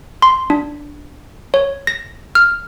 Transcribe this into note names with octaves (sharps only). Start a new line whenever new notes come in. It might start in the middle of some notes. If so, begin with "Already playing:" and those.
C6
D4
C#5
A#6
F6